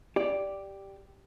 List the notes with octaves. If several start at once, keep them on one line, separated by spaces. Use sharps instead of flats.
G4 D5